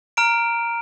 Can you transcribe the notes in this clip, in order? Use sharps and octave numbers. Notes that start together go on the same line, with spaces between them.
A#5 F6 D7